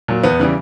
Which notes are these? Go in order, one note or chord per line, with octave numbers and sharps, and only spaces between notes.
A#2 F#3
E2 B3
C#3 E3 G3